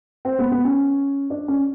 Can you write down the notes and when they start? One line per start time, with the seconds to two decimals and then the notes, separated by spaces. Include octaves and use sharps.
0.25 C4
0.39 B3
0.52 B3
0.65 C#4
1.30 D4
1.48 C#4